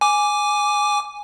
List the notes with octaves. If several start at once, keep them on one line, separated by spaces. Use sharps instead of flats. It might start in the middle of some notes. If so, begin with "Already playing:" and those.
G#5 D6